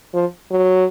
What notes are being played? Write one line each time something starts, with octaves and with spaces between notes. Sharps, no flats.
F3
F#3